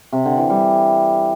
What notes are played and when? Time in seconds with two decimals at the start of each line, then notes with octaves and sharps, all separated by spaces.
0.13 C3
0.25 D3
0.38 E3
0.50 G3